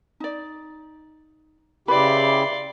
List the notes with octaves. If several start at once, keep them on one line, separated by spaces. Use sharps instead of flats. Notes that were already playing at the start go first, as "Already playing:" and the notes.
D#4 D5
C#3 E4 G4 B4 D5 E5 B5 C6